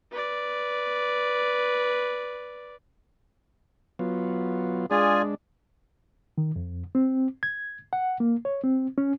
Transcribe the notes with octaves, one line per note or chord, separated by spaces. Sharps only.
B4 D5
F#3 B3 F4
G#3 D4 F4 G#4 D5 G#5
D#3
F2
C4
G#6
F#5
A#3
C#5
C4
C#4